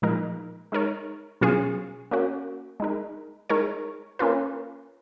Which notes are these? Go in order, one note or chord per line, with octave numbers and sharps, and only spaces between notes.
A#2 F3 G#3 D#4 A#4
G#3 D#4 A#4 C#5
B2 F#3 C#4 F4 G#4
A#3 C#4 F#4
G#3 D#4 A#4
G#3 D#4 A#4 C#5
A#3 C#4 F4 B4